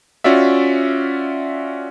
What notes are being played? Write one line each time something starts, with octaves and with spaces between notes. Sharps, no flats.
C#4 F4 F#4 D5 E5